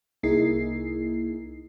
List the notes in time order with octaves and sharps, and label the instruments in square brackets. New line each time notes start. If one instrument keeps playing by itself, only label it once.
[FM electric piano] C2 A#3 D#4 E4 G#4 C7